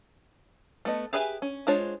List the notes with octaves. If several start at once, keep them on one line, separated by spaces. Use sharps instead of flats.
A3 B3 D#5
G4 G#4 B4 E5 G#5
C#4
G#3 D4 F4 C5 C#5